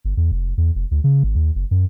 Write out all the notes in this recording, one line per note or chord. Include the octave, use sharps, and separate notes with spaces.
G1
E2
F1
E2
F1
D2
C#3
G#1
D#2
F#1
F#2